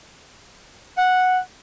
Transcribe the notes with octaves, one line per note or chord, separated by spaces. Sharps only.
F#5